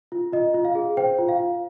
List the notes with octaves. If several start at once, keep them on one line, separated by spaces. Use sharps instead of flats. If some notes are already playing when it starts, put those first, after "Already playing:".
F4
F4 D#5
F4
F5
G#4
C5 G5
F4
F5
F4